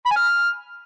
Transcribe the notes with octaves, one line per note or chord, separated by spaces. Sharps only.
B5
G#5
F6